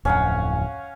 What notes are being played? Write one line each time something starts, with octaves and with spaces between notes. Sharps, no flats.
D1 F2 C#4 F5 F#5